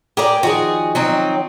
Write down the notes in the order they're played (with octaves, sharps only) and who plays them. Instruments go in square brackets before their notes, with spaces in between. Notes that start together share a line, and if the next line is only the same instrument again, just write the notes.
[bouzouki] G4 [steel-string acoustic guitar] G#4 A#4 D5
[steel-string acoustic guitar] D#3 F3 [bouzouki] F#4 G#4
[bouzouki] F#3 C4 D#4